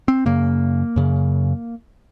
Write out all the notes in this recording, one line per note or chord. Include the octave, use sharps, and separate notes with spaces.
C4
F#2 C#3 A#3
F#2 C#3